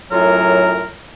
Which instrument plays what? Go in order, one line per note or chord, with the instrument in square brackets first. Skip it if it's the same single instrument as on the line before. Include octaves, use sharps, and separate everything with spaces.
[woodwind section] F#2 A2 F#3 F4 A#4